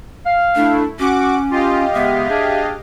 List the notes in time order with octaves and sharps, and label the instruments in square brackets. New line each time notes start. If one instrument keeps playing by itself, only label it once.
[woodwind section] F5
[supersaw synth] A3 E4 [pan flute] D4
[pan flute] C#4 [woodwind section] F#4 [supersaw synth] F#5 D6
[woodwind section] F4 [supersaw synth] G4 D#5 F5
[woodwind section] C#3 G#3 B3 [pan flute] E5
[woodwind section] D4 G#4